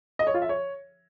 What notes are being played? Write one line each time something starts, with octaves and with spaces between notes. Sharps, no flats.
D#5
C#5
F4
E5
C#5